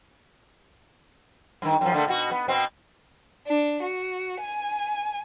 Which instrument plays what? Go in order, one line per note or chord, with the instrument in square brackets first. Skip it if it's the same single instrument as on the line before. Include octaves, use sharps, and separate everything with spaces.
[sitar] G2 D#3
F#2 F3
D3 A3 A#3
B2 F#4
B3
B2 C4
[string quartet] D4
F#4
G#5